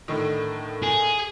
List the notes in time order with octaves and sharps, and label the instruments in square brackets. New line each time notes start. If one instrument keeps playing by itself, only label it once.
[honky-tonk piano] A2 D3 D#3
[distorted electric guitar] G#4